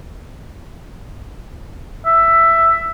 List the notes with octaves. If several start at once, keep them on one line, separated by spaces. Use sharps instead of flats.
E5